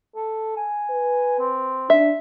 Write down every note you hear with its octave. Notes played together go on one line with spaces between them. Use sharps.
A4
G#5
B4
C4
D4 E5